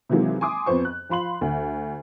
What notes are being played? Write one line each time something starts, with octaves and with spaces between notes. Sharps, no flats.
C3 D#3 E3 F#3 G#3 A#3
G#5 C6 D6 D#6
F2 B3 C5 C#6
F#6
F3 F5 B5 C6 F#7
D2